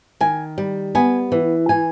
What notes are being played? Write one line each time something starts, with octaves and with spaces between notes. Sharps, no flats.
D#3 G#5
G3
B3 G#5
E3
E3 G#5